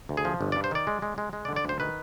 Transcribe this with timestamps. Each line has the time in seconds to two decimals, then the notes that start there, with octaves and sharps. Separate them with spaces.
0.09 D2
0.17 G#4
0.25 F3
0.41 G1
0.52 D5
0.56 G2
0.64 C5
0.71 D#3 D5
0.87 G#3
1.02 G#3
1.18 G#3
1.33 G#3
1.45 D5
1.49 D3
1.56 D5
1.64 D2 C5
1.80 D#3 B4